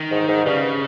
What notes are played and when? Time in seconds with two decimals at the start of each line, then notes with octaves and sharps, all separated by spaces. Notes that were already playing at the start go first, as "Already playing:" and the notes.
Already playing: D#3
0.11 G#2
0.28 G#2
0.46 G2 C#3